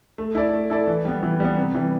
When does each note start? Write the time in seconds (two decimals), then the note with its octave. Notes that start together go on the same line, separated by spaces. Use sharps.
0.18 A3
0.35 E4 A4 D5
0.53 A3
0.70 E4 A4 D5
0.87 E3
1.05 G3 B3
1.23 E3
1.40 G3 B3
1.57 C3
1.75 E3 G3